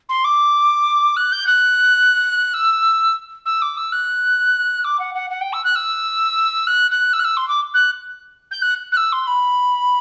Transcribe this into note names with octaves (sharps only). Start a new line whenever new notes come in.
C6
D6
F#6
G6
F#6
E6
E6
D6
E6
F#6
D6
F#5
F#5
F#5
G5
E6
F#6
E6
F#6
F#6
E6
F#6
E6
C6
D6
F#6
G6
F#6
F#6
E6
C6
B5